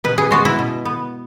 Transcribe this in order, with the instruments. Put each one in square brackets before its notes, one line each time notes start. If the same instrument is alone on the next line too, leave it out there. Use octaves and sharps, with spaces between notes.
[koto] B2 B4
G#4
G#3 B3 F#4
E4
B2
B3